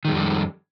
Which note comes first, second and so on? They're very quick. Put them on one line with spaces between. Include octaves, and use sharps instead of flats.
D#3 G#3 F2 G3